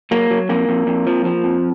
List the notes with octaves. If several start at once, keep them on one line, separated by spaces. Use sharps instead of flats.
F#3 A#3
F#3
F2 A#3
F2
F2
F3
F3
F2